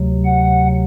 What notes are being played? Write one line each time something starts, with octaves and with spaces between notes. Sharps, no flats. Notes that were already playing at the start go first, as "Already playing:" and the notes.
Already playing: D2 C3 F#3
F#5